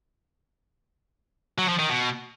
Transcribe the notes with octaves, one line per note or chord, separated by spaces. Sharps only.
F#3
F3
D#3
B2